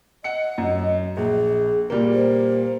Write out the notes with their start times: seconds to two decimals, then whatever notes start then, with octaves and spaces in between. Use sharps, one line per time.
0.24 D#5 F#5 C#7
0.58 F#2
1.17 A#1 G#4
1.90 A#2 G3 A#3
2.13 C5